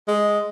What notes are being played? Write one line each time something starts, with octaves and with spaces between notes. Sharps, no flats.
G#3